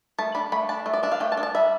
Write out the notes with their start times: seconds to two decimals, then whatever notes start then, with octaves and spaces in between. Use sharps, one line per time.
0.19 A3 A5
0.35 D4 B5
0.52 A3 B5
0.69 D4 A5
0.86 A3
0.94 D5
1.03 D4 E5
1.12 F5
1.20 A3 G5
1.32 A5
1.37 D4
1.43 A5
1.55 G3 E5